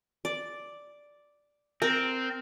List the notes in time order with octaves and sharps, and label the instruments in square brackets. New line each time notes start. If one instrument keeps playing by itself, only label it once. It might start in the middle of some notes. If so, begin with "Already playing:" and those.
[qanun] D5
[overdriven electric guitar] C4 [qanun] A#4